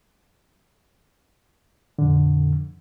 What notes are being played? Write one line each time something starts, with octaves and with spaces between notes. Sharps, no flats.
F2 A#2 D3